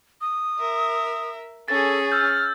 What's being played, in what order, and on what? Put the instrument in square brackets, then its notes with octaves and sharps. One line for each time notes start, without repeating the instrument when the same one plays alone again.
[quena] D#6
[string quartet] A#4 E5
[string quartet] C#4 G#4 [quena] A4 [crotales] A6
[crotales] E6 G6 [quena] F6